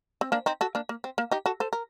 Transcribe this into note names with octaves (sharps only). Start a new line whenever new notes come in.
C4
A#3 D4
C4 D#4
F#4 A4
A#3 D4
A#3
C4
A#3
D#4 G4
F#4 A4
A4 C5
A#4